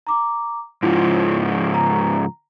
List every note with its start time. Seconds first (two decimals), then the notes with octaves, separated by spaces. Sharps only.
0.07 A#5 D6
0.83 G#2 C#3 F3 E4 F4
1.74 A#5